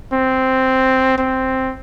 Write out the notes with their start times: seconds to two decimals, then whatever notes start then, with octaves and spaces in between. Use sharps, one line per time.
0.13 C4
1.18 C4